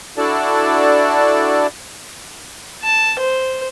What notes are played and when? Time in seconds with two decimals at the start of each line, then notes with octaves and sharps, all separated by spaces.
0.18 D4 E4 F#4 A4 D5 A5
2.82 A5
3.19 C5